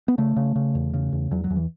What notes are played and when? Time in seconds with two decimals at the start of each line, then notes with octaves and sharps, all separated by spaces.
0.08 B3
0.18 C#3 A3
0.36 C#3
0.56 C#3
0.75 E2
0.94 C#3
1.12 E2
1.31 E2 F#3
1.44 F#3
1.50 E2
1.56 E3